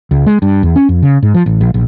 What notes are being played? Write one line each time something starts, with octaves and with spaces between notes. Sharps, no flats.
C#2
G#3
G2
E2
C#4
F2
C#3
G#2
F3
A1
A#1
A#1